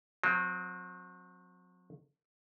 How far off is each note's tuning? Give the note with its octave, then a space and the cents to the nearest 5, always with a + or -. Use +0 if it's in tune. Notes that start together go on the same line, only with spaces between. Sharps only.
F#3 -35 C4 +0